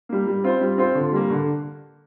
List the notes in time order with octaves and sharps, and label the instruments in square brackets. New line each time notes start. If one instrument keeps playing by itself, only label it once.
[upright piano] G3 A#3
G3
C4 F4 C5
G3
C4 F4 C5
D3
G3 A#3
D3